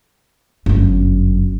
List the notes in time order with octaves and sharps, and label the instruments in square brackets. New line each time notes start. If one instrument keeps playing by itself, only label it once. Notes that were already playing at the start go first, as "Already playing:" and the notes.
[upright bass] G1 F#2